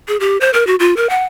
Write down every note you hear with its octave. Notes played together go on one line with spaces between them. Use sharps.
G#4
G4
C5
A#4
F#4
F4
A#4
F#5